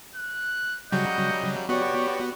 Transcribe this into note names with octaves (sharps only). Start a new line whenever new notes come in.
F#6
C#3 F#3 G3 F#4 D#5 G6
B3 F#4 G4 C#5 D5 C#6